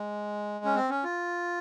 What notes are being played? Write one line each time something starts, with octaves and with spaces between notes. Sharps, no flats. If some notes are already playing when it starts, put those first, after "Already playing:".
Already playing: G#3
C#4
C4
C#4
F4